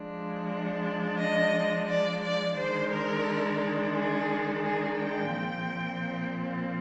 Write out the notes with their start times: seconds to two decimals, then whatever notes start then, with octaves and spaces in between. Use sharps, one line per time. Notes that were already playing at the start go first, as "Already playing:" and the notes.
Already playing: F3 G#3 D4
1.18 D#5
1.88 D5
2.22 D5
2.57 D#3 G#3 D4 C5
2.91 A#4
3.96 G#4
4.64 G#4
4.98 G5
5.33 A#2 F3 C4